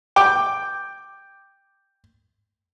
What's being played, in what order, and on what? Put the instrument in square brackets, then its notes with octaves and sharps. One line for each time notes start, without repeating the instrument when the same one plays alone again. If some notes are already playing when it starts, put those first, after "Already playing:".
[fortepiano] G5 D6